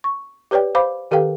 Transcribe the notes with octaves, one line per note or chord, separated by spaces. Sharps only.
C#6
G4 B4 C#5 D5 G5
C5 F5 B5 D6
D#3 G4 A4 B4 F5 G5